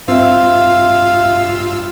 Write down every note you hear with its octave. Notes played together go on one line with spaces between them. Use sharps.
G2 C4 F4 E5 F5 E6